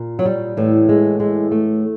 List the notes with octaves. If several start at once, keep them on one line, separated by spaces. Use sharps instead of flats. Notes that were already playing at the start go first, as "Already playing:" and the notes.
Already playing: A#2
F#3
G3
A2 E3
G#3
G#3
A3